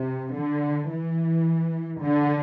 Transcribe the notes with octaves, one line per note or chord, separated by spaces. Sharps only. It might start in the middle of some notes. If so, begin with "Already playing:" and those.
Already playing: C3
D3
E3
D3